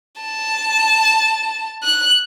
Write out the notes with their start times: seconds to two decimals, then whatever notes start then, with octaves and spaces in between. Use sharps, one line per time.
0.21 A5
1.83 F#6